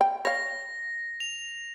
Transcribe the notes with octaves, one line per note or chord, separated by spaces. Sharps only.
G5
C#5 F5 A#6
F7